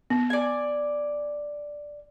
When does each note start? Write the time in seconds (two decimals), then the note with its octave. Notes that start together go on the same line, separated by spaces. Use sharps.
0.10 B3
0.30 D5 G#5